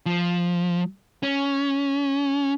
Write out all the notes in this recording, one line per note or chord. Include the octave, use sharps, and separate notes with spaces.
F3
C#4